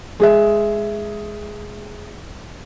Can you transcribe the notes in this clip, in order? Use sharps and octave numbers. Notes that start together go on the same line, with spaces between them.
G#3 G#4 E5